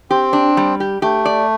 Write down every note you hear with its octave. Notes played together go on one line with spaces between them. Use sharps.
C4 G4
D4
G3
G4
A3 G4
D5